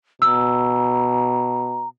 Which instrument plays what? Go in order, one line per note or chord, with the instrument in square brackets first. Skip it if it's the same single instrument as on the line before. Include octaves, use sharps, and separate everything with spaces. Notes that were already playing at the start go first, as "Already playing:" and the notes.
[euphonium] B2 [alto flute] A#5 [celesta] E6